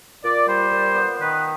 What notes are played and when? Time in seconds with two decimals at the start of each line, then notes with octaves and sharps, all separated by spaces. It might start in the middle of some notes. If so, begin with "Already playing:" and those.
0.23 A#2 D5
0.47 G3 C5
0.71 A#2
0.95 B3
1.19 D#3 B4